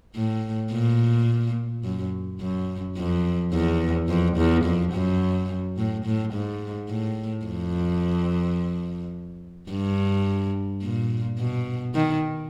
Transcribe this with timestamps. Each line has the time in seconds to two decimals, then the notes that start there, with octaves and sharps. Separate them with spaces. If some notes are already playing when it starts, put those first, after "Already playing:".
0.16 A2
0.72 A#2
1.84 F#2
2.40 F#2
2.97 F2
3.53 E2
4.08 F2
4.37 E2
4.65 F2
4.93 F#2
5.78 A2
6.05 A2
6.33 G#2
6.89 A2
7.46 F2
9.70 G2
10.83 A#2
11.39 B2
11.95 D#3